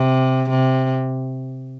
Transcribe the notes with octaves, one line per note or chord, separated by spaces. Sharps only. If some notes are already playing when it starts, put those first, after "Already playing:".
Already playing: C3
C3